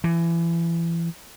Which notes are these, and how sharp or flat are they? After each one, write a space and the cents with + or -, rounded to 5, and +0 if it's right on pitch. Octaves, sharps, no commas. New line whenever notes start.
E3 +30